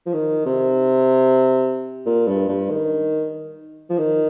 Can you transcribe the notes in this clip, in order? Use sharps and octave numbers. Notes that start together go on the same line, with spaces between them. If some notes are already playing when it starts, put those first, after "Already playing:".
F3
D#3
C3
A#2
G2
G2
D#3
F3
D#3